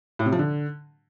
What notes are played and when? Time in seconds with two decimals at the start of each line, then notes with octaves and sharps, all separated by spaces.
0.19 A2
0.26 C3
0.32 F3
0.39 D3